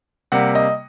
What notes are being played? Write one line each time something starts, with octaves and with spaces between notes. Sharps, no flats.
C3 G3 A#3 F#5
D#5